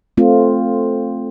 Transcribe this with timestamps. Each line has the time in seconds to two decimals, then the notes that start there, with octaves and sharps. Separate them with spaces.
0.17 A3 C4 F4